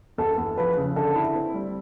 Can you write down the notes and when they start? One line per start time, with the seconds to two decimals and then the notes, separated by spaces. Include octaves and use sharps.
0.18 E2 A4
0.38 E2
0.57 F3 B4
0.77 C#3
0.96 D3 A4
1.16 E4
1.35 C4
1.54 G3